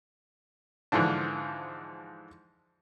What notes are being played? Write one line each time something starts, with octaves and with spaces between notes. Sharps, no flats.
G#2 D3 E3 F3 D4